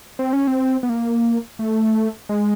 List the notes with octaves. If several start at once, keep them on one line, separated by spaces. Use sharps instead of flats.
C4
C#4
C4
B3
A#3
A3
G#3